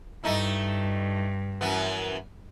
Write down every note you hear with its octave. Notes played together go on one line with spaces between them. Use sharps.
G2 A3 D#4 E4
F#2 E3 B3